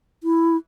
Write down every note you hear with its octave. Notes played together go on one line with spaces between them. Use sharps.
E4